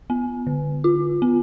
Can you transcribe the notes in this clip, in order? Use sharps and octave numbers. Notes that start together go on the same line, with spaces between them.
B3
D3
F4
B3